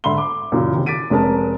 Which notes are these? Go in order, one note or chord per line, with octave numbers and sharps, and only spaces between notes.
G#2 D3 E5 B5 C6 G7
D6
F#2 A#2 C#3 E3
C3 D#3
D6 A6 B6 D7 D#7
F1 G#3 C#4 A#4 A5